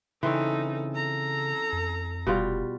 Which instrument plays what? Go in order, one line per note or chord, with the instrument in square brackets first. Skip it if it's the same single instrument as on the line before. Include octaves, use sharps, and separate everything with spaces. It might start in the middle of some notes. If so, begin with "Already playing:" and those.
[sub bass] C#3 [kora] E3 C4 C#4 [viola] D#4 A4
[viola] A4 A#5
[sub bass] F2
[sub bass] F1 [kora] B2 G3 F4